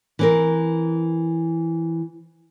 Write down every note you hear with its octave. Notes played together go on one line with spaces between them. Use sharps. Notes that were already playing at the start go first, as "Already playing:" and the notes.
E3 C4 A#4